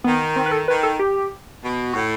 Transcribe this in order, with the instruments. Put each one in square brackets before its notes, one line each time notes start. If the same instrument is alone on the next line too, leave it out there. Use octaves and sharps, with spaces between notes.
[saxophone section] D#3 [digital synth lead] B3
[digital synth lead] C4
B4
A4
[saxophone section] D#3 [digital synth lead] B4
[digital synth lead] A4
G4
[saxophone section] B2
[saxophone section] A2 [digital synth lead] F#4